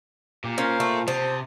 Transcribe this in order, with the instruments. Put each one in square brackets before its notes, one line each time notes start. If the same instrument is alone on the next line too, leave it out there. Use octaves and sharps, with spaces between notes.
[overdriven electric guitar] A#2 [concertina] G4
[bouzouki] C#4 [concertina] A#4 C5 F5
[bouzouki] A3
[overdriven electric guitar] C3 [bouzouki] C5 [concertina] A5 D#6